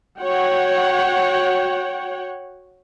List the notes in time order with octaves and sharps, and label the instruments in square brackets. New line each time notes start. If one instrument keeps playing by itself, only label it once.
[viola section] F#4 C#5 F#5 G5